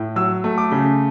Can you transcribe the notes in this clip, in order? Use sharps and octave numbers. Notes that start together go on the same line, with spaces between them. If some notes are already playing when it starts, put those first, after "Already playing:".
Already playing: A2
F#3 E6
A3
D6
C#3